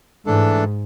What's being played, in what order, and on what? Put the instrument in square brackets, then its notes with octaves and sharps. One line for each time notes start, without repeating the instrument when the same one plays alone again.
[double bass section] G#2 [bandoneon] E3 A3 D4 A4